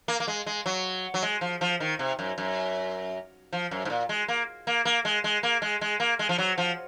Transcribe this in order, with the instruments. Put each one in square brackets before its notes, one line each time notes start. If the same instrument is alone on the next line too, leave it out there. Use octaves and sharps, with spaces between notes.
[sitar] A#3
A#3
G#3
G#3
F#3
F#3
G#3
F3
F3
D#3
C3
F#2
F#2
F3
F#2
G#2
A#2
G#3
A#3
A#3
A#3
G#3
G#3
A#3
G#3
G#3
A#3
G#3
F3
F#3
F3